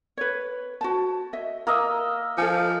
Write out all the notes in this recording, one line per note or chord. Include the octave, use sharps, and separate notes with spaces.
B4 C#5
F#4 C5 A5
D#5 E5
A#3 D#5 E5 A#5
F3 A4 G#5